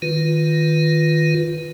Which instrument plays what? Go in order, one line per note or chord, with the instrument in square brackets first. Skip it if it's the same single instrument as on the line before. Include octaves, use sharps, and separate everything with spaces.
[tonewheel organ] D#3 F4 B4